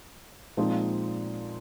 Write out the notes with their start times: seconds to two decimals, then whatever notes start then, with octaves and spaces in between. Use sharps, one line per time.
0.57 A#2 F3 G#3 C4 D#4